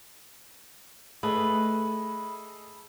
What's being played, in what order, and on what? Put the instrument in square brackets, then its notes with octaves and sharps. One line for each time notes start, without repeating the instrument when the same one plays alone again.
[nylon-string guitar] A3 [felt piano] G#4 A4 D#5 [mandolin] B4